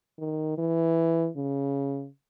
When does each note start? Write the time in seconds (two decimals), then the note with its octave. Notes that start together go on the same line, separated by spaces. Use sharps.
0.19 D#3
0.58 E3
1.36 C#3